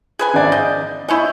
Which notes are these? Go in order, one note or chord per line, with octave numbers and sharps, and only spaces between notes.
G#4 B4 G#5
G#1 D5 E5
D#5 G6
E4 C#5 D#5 G#5 C#6 G6